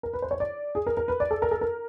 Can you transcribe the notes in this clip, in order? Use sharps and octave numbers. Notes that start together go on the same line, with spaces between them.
A#4
B4
C5
C#5
D5
G#4
A#4
A#4
B4
D5
A4
A#4
A4
A#4